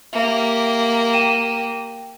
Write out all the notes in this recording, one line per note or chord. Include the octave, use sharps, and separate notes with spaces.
A#3 G4 E5
G5 D#7 E7